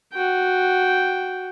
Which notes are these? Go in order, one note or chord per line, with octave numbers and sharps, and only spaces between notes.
F#4 G5